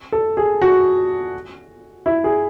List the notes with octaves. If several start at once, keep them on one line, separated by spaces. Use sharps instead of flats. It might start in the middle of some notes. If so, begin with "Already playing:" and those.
A4
G#4
F#4
E4
G#4